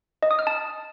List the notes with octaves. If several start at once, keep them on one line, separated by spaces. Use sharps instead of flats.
D#5
D#6
F6
A5